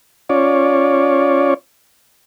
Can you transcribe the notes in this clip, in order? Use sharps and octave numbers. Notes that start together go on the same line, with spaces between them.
C#4 F4 C#5 D5